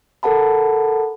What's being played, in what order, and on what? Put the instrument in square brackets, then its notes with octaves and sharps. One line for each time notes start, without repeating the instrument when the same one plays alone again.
[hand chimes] A4 A#4 F#5 A5 B5